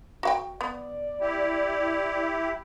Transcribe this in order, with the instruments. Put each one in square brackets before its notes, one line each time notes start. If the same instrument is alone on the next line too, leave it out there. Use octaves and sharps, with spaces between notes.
[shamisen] F#4 F5 G5
[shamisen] B3 [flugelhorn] D5
[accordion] E4 G4
[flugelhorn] E5